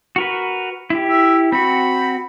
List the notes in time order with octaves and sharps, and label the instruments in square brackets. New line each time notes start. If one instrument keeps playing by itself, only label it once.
[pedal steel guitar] F#4 A#4 B4
E4 G4
[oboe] E5
[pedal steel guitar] C4 F#4 [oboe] B5